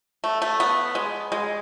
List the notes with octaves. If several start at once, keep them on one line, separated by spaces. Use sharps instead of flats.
A3
A3
B3
G#3
G#3